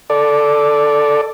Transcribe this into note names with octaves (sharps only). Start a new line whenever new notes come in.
A4 D5